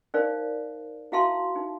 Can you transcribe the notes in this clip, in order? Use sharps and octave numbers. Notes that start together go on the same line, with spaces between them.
D#4 A#4 C5 D5 F5
E4 F#4 E5 F5 A5 C6
D#4